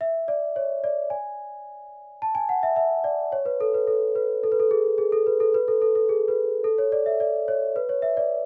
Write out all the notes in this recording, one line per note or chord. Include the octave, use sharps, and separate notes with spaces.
E5
D5
C#5
D5
G#5
A5
G#5
F#5
E5
E5
D5
C#5
B4
A4
B4
A4
B4
A4
B4
A4
G#4
G#4
A4
B4
A4
B4
A4
A4
A4
G#4
B4
A4
C#5
D5
E5
D5
C#5
B4
C#5
E5
D5